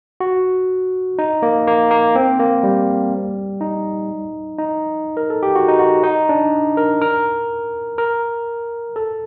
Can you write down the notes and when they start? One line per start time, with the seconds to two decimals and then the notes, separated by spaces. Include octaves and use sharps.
0.20 F#4
1.19 D#4
1.42 A#3
1.67 A#3
1.91 A#3
2.16 C4
2.39 A#3
2.63 G3
3.61 D#4
4.58 D#4
5.17 A#4
5.30 A4
5.43 G4
5.55 F#4
5.68 D#4
5.79 F#4
6.04 D#4
6.29 D4
6.77 A#4
7.02 A#4
7.98 A#4
8.96 A4